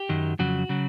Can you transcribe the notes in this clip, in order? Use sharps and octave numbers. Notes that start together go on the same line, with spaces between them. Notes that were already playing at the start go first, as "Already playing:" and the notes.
Already playing: G4
F#2 D#3 F#3
F2 C#3 F#3 F#4
C#3 F#3